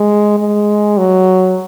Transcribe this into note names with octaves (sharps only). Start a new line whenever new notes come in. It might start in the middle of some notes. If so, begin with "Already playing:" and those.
Already playing: G#3
G#3
F#3